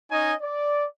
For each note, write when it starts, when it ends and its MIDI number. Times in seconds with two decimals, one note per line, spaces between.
0.11 0.33 61
0.11 0.33 63
0.11 0.33 73
0.11 0.33 75
0.11 0.33 80
0.41 0.85 74